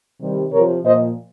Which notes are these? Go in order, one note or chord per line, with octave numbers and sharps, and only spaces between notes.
C3 D#3 G3
C3 F3 A#4 C#5
A#2 F3 C5 D#5